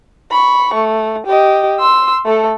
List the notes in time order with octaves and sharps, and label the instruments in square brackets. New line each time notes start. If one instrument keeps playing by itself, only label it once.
[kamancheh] B5 C#6
A3
G4 D#5
C6 E6
A3 A4